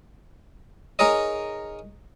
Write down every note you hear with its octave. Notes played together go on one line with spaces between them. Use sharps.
D#4 G#4 A#4 C#5 D#5